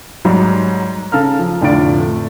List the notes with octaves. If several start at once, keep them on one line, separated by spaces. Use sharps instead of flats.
G#2 F#3 G3
C#3 A4 F5 A#5 F6
F3
F1 A2 D3 F4 D5 D7
A3